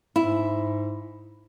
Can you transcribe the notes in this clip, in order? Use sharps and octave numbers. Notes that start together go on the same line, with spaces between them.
G#2 E4